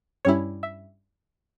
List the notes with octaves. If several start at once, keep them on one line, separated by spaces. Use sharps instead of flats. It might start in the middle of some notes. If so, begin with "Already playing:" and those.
G2 G3 C#4 E4 C#5
E5